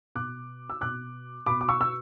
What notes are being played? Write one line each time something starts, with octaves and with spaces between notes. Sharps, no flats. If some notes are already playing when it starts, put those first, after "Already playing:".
B2 D6 F#6
E6
B2 D6 F#6
B2 B5 D6
D6
C#6 E6
E6